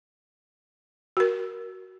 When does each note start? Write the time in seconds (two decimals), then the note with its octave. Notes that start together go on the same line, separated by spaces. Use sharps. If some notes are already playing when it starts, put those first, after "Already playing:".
1.17 F#4 A#4